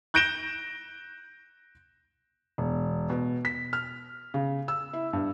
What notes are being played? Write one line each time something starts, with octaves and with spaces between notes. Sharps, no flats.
F#6 G6 A#6 D7 E7 G7
E1
B2
B6
F6
C#3
E6
E4
G2